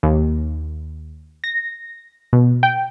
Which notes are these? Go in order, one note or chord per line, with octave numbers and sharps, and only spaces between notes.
D#2
A#6
B2
G5